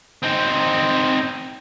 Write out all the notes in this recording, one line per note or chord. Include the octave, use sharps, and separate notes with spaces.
C4 D#4